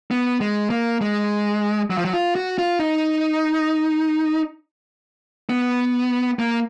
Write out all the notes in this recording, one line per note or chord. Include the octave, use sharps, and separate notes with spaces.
B3
G#3
A#3
G#3
F#3
F3
F#3
F4
F#4
F4
D#4
B3
A#3